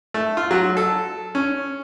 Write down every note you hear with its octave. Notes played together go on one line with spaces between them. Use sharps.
A3
F4
F#3
A4
C#4